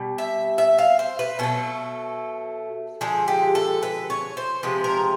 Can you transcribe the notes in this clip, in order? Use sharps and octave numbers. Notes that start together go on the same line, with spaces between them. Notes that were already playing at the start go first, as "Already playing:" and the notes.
Already playing: B2 G3
E5
E5
F5
C5
B4
B2 F#3 A3 A4
D3 F3 G#3 G#4
G4
A4
B4
C#5
C5
C3 F3 G#3 B4
A#4